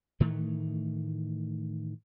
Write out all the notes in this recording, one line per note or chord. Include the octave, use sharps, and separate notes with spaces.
A2 D#3 E3 A3